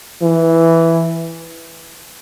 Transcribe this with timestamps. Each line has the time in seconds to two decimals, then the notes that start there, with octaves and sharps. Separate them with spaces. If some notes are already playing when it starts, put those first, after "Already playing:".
0.22 E3